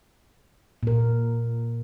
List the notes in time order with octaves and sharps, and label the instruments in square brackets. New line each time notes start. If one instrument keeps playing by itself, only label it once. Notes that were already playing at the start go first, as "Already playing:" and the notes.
[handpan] A#2 A#4